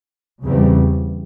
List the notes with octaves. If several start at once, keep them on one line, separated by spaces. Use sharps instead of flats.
E2 C#3 G3 C4